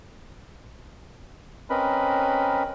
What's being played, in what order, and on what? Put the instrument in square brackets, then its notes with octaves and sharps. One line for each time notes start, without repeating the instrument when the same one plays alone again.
[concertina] C4 C#4 A#4 B4 D#5 B5